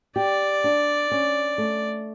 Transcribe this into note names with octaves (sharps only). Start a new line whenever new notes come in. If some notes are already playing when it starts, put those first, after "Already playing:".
G4 D5
D4
C#4
A3